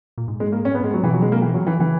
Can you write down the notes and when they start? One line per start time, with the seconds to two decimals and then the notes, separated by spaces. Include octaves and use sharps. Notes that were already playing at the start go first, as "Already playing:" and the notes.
0.18 A#2
0.28 G#2
0.40 G#3
0.52 A#3
0.65 C#4
0.75 B3
0.84 G#3
0.93 F#3
1.03 B2 E3
1.13 F#3
1.22 G#3
1.32 A#3
1.42 E3
1.54 F#3
1.67 E3
1.79 C#3 E3